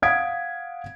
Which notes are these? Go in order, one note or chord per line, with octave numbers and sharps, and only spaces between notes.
F5 F#5 D#6 G#6 B6 D7